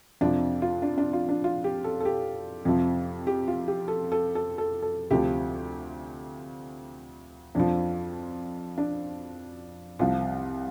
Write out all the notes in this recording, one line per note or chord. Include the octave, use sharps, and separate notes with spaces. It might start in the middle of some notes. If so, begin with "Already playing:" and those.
F2 C3 F3 D4
F4
D4
D4
F4
D4
F4
G4
A4
A4
G4
F2 C3 F3
G4
F4
G4
A4
A4
A4
A4
A4
D2 C3 F3 G4
F2 F3 D4
D4
C2 C3 F3 F4